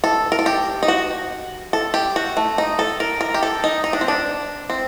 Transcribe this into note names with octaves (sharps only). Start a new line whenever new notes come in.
A4
A#4
A4
G4
D#4
F#4
A4
G4
F#4
A3
D#4
A4
A#4
A#4
G4
A4
D#4
D#4
D4
C4
D4
C4